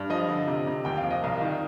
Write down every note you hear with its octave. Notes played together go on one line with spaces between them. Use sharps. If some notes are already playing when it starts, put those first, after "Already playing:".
Already playing: G2
F3 D#5
D3
C3
C3
D#2 G5
F5
F3
D#5
C2 F5
D#3